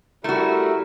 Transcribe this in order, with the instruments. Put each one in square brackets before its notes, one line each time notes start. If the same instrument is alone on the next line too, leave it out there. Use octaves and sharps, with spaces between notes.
[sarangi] G3 [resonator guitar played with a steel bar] A3 F#4 [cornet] E4 [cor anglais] A#4